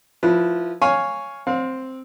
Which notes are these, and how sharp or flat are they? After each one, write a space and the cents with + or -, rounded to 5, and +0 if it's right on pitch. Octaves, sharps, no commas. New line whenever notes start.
F3 +0 E4 +0 B4 -25
C#5 +0 F5 +0 G#5 +0
C4 +0 F5 +40